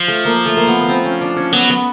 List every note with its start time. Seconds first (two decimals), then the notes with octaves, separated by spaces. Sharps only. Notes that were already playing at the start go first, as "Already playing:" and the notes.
Already playing: F3
0.08 A3
0.25 A#3
0.46 A3
0.57 A#3
0.67 B3
0.82 B3
0.88 C4
1.05 C#4
1.21 D4
1.37 C#4
1.52 F#3 B3
1.70 B3